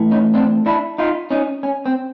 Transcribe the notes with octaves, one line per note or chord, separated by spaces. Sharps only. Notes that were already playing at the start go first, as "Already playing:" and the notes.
Already playing: E3 A3
C#4 D#4
C4 D4
D4 E4
D#4 F4
C#4 D#4
C#4
C4